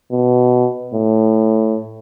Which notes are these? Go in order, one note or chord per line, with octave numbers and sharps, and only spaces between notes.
B2
A2